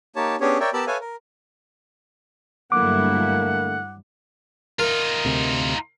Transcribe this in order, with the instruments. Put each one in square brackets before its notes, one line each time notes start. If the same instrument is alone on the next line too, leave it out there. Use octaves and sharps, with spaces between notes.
[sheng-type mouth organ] A#3 D#4 G4 C#5 A5
B3 C#4 D4 G4 G#4 C#5
A#4 C#5 D5 E5 G5
B3 G4 A#4 A5 B5 E6
A4 B4 C#5 E5 F5 G#5
A#4
[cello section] G2 F#3 E4 [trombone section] D3 A3 A#3 [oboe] F#5 [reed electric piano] D6
[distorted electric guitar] D#4 F4 [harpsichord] A#4
[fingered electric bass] D2 C3